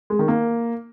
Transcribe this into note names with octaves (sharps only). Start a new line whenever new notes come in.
G#3
D#3
A#3